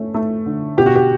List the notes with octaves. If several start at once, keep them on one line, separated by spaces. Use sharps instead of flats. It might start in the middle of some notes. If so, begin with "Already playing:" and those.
Already playing: A3 C#4
A3
D3
B2 G4
F#4
G4